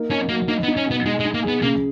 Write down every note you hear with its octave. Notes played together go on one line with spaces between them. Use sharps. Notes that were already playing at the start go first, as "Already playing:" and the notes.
Already playing: A#3 D#4
C#4 D#4
F#3 A#3
A#3 D#4
B3
D#4
C#4
B2 B3
G#3 D#4
G#3
D#4
A#3
G#4
B3
C#3 A#3